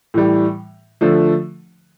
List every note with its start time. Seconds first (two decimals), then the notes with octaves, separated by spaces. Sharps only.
0.14 A2 E3 G3
1.01 D3 F3 A3